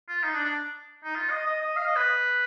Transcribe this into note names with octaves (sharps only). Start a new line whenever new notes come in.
F4
D#4
D4
D4
D#4
F4
D#5
D#5
D#5
F5
D#5
B4